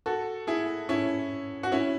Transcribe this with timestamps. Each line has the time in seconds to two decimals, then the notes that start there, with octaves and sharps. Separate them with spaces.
0.06 F#4 A4
0.47 E4 G#4
0.89 C#4 E4
1.63 F#4
1.72 C#4 E4